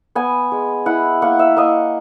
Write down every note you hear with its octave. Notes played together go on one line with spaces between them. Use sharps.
B3 G#5
G#3
E4 F#5
A#3 F#5
E5
A#3 D#5